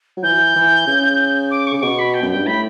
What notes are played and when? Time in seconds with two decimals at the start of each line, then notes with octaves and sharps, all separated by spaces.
0.17 F#3
0.23 E3 G6
0.56 E3
0.87 C#3
1.51 D6
1.67 C#6
1.73 C#3 D6
1.82 B2 C#6
1.99 B5
2.14 G5
2.22 F#2
2.30 G2 G5
2.46 A2 B5